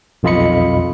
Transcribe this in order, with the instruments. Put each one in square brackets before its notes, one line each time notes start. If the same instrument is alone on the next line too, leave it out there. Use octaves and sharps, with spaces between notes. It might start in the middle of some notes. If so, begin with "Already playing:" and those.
[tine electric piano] B1 F2 F4 D#5 B5 C#7